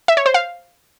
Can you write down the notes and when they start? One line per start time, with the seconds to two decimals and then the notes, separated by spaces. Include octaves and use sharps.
0.08 E5
0.17 C#5
0.26 C5
0.34 F5